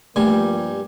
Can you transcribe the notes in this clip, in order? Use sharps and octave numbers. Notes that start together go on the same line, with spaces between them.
G2 F3 G3 A3 A#3 G4 G#5